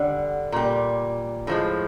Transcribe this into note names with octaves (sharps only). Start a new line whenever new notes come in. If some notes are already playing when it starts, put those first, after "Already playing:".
Already playing: D3 G3 F#5
A#2 G3
A2 F3 G#3